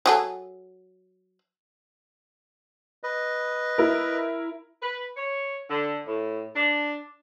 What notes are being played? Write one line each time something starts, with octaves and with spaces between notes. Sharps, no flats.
F#3 G#4 A4
B4 D#5
E4 A#4
B4
C#5
D3
A2
D4